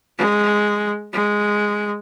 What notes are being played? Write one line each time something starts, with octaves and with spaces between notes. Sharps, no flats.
G#3
G#3